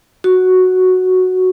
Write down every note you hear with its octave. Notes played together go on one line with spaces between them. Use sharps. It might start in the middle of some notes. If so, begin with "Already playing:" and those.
F#4